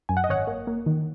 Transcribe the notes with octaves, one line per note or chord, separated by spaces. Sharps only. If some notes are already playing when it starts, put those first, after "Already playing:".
F#2 G#5
F#5
D#5
G#1 C#5 F#5
A#3
A#3
D#3